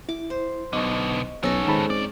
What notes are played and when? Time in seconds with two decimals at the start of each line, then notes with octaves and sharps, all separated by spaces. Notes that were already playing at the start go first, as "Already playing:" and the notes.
0.09 E4 D6
0.30 C5
0.73 B1 B2 D3 D#5 C#6
1.43 B1 B3 C#4 D#4 A4
1.67 G#2 D#3 A5 B5
1.90 F#2 C4 D5